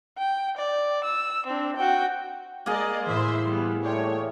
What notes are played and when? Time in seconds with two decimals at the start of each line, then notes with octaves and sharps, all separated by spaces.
0.18 G5
0.57 D5
1.04 E6
1.46 C4 D4
1.76 F#4 G5
2.66 G#3 A#3 G#4 D5 D#5
3.06 A2 E3 C5 E5 C6
3.47 G3 B3 E7
3.85 A2 C#5 D5 G5 C6